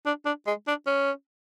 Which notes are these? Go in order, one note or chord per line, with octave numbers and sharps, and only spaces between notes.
D4
D4
G#3
D4
C#4